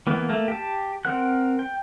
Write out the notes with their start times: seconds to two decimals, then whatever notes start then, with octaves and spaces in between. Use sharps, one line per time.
0.07 E3 A#3 B3
0.29 A3 A#3
0.48 G4 A5
1.05 C4 A#4 F#5 F#6
1.59 G5